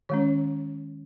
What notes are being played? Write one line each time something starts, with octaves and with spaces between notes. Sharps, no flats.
D#3 G#3 C#4 C#5